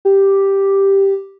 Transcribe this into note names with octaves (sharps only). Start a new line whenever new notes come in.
G4